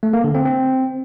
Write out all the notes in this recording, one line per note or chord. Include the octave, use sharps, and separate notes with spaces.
A3
A#3
D3
C4
C4